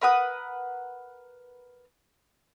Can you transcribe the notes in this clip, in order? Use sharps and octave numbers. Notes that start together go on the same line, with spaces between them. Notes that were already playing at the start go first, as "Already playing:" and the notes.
A#4 B4 F#5 D#6